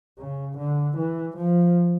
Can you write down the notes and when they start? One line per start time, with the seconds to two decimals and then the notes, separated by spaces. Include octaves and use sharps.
0.19 C#3
0.58 D3
0.97 E3
1.37 F3